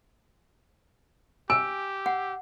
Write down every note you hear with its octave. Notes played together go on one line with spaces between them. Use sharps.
G4 G#5 E6
F#5